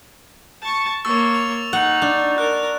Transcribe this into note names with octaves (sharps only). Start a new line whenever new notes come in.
A5 C#6
A#3 C#5 C#6 E6 A6
F7
D#4 F#5
D4
A#4 F#6